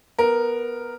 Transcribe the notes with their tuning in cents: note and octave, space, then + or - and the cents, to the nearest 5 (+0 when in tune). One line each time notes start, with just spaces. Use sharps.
B3 -10 A#4 +0